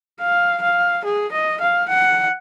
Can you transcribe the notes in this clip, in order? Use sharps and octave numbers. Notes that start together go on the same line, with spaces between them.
F5
F5
G#4
D#5
F5
F#5